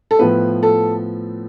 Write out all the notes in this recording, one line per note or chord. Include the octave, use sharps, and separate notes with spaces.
A4
A2 F3 B3 B4
A4